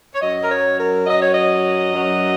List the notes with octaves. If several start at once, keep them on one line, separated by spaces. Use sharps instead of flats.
C#5
F#2 F#3 D#5
A#4
C#5
A#4
F#2 F#3 D#5
C#5
D#5
F#2 F#3